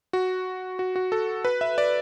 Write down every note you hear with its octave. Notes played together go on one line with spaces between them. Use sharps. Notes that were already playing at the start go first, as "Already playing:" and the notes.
F#4
F#4
F#4
A4
B4
E5
D5